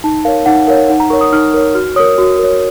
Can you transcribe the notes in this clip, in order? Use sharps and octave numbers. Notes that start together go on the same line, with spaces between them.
D#4 A5
A#4 C#5 F5
D#4 F#5
A#4 C#5 F5
D#4 F#5
A#5
A#4 C#5 C#6
D#6
D#4 F6
A#4 C#5
F#4 F6
A#4 C#5 D#6
F#4
A#4 C#5